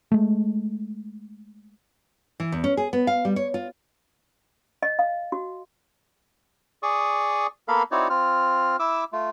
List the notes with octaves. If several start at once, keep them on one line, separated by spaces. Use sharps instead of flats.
G#3 A3
E3
E2
C#4
G#4
B3
F5
G3
C#5
F4
D#5
F5
F#4
G#4 D5 C#6 D#6
A#3 B3 A4 A#4 F5 B5
C4 D#4 E4 F#4 C#5 D5
C4 F4 F6
E4 E5 D6 E6
A3 F4